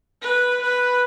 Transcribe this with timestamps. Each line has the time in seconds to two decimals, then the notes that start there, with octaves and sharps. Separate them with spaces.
0.22 B4
0.62 B4